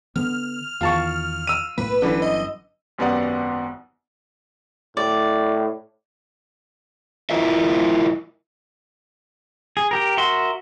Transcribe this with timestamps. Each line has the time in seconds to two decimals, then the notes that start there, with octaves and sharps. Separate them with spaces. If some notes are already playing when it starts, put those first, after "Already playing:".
0.16 D3 B3 F6
0.81 E2 D#3 F4 A5 C#6
1.47 E6 D#7
1.78 B1 A2 A#3 B4
2.02 G1 D3 E3 F#3 C#4
2.22 D#5
2.98 G#1 F#2 B3 G4 D5 F#5
4.97 A2 D5
7.30 E4 F4 A#4 D#5 E5
9.77 G#4
9.91 G4 A#4
10.17 F#4 A#4 E5 C6